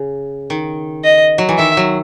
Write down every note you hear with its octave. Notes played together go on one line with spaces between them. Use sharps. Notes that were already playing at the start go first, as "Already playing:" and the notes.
Already playing: C#3
D#3
D#5
F#3
E3
D#3 E5
F#3